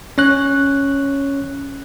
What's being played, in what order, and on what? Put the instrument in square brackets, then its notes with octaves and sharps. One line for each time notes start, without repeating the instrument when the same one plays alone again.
[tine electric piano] C#4 C#5 F#6